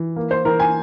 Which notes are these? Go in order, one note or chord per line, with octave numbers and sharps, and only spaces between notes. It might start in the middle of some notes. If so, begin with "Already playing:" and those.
Already playing: E3
A#3
C5
E3 A#4
G#5